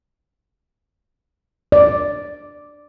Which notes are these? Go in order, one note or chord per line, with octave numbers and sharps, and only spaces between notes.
D5